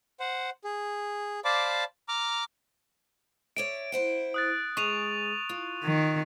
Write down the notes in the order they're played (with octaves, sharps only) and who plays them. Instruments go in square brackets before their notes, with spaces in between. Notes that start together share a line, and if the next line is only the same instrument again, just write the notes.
[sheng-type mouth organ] C5 F#5
G#4
C5 D5 F5 A5 B5 D6
A#5 D6 F6
[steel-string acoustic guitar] C#5 D5 E5 [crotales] D7
[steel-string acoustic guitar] E4 C5 F#5
[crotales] D#6 F#6 A6
[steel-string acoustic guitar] G#3 G#4 [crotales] C#6 D#7 F7
[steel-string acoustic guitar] F4
[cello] D#3